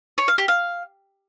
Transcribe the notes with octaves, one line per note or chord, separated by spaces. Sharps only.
C#5
F5
G4
F5